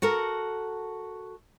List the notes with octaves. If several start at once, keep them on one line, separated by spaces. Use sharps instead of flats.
F#4 A4 A#4